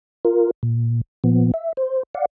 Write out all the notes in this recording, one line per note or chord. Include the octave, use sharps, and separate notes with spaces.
F4 A#4
A#2
A#2 F3 B3
E5
C5
D5 F5 F#5